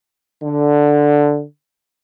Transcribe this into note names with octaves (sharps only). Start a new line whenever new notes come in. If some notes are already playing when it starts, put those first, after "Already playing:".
D3